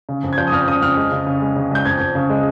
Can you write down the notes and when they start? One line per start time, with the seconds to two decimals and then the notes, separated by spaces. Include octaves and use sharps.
0.09 C#3
0.24 F2
0.33 G#6
0.38 F3 G6
0.48 D#6
0.52 F2 F6
0.67 C#3 D#6
0.82 F2 F6
0.97 G#3
1.12 C#3
1.27 C#3
1.42 G#3
1.57 C#3
1.71 C#2 G6
1.85 F2 G#6
2.00 F2
2.15 C#3
2.30 G#3